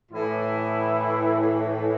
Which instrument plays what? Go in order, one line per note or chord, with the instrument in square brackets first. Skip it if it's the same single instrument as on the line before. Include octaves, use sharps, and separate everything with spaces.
[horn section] A2 E3 E4